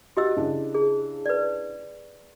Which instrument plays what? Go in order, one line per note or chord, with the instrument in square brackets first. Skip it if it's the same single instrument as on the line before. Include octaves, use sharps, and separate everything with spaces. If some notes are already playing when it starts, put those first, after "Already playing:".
[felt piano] F#4 [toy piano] G4 D#5 E6
[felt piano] C#3 D4 E4
[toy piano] G#4
B4 D5